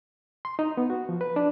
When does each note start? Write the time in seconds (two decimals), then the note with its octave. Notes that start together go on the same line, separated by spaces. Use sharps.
0.45 C6
0.59 D#4
0.77 B3
0.90 F#4
1.09 F3
1.21 B4
1.36 D4